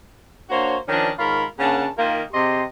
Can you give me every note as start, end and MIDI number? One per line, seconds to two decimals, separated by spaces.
0.50 0.76 58
0.50 0.76 62
0.50 0.76 66
0.50 0.76 72
0.50 0.76 73
0.88 1.10 51
0.88 1.10 53
0.88 1.10 61
0.88 1.10 62
1.18 1.44 44
1.18 1.44 51
1.18 1.44 65
1.18 1.44 70
1.18 1.44 73
1.18 1.44 83
1.59 1.87 49
1.59 1.87 58
1.59 1.87 61
1.59 1.87 62
1.59 1.87 78
1.59 1.87 81
1.98 2.22 51
1.98 2.22 58
1.98 2.22 65
2.33 2.62 48
2.33 2.62 67
2.33 2.62 68
2.33 2.62 75
2.33 2.62 84